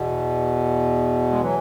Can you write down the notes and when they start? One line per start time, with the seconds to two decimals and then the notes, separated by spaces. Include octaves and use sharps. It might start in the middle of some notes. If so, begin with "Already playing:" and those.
Already playing: E2 B2
1.31 G#3
1.41 E3 F#3